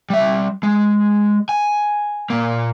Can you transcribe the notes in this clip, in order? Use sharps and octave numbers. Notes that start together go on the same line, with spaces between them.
G3 E5
G#3
G#5
A#2 A#3